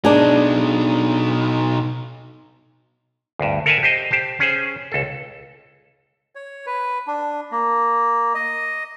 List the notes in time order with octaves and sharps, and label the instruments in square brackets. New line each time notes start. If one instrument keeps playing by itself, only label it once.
[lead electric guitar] B2 D#4 [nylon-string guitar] D4 G#4
[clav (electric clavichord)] D2 G2
A4 A#4 E5 F#5 G#5 A5
G4 C5 D#5
G4 C5 A5
C#4 G#4 C5
C#2 A4
[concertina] C#5
B4
D4
A#3
D#5